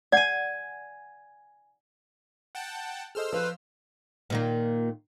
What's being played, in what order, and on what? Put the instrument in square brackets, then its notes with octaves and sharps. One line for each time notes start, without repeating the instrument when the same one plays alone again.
[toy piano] D5 F#5 [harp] G#5 G#6
[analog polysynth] F#5 G5 A5
[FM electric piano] G#4 A4 D#5 [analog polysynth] C5 E6 F6
[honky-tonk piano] F3 [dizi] B4
[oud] A#2 D#3 A#3